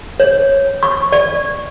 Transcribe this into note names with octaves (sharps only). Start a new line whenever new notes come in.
C#5
C#6
D5